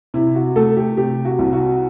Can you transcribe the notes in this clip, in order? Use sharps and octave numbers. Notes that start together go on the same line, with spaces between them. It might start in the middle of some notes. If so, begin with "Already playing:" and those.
C3 E4
F#4
A3 A4
G4
C3 G4
F#4
C2
F#4